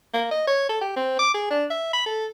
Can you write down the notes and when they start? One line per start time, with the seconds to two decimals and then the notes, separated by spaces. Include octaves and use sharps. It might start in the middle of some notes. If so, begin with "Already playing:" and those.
0.14 A#3
0.31 D#5
0.47 C#5
0.69 A4
0.81 G4
0.96 C4
1.19 D6
1.34 G#4
1.51 D4
1.71 E5
1.93 B5
2.06 A4